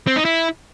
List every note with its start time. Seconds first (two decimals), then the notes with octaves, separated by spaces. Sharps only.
0.07 C4
0.16 D#4
0.25 E4